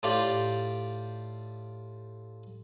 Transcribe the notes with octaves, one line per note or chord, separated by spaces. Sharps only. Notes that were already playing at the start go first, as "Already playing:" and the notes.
A2 F4 G4 D5 F5 G5